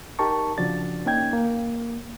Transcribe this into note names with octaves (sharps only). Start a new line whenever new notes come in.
D#4 G4 A#4 A5 C#6
C#3 F3 D4 F#4 D5 A6
A#3 C#4 D#4 G5 G#6
A#3